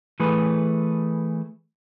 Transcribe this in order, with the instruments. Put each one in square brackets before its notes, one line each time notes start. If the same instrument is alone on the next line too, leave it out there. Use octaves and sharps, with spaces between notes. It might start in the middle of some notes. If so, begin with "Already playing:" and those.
[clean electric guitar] E3 A3 G#4 B4